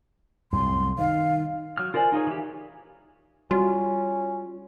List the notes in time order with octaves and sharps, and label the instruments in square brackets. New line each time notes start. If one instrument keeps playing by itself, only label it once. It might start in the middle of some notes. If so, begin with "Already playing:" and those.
[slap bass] C2 F#2 A2 [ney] C6
[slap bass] D#3 [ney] F5
[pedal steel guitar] F#3 F6
F4 A#4 C5 D5 G#5
D#4 F4 G#4 C#5
E3 G4
[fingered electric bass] G3 [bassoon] C#4 [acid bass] F4 [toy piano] F#4